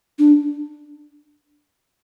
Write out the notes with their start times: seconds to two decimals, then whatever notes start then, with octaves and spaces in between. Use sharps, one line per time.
0.19 D4